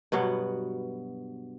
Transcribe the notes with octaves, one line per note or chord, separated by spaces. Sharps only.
G2 B2 F#3 B3